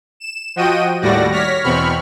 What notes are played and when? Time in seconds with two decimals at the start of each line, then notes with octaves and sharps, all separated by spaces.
0.20 E7
0.56 F3 F#4 D#5 G5 D#7
1.01 D#2 A2 G3 F#4 D5 A#6
1.31 C#5 F6 A#6 B6
1.63 E2 B2 C4 B5 C#6 F6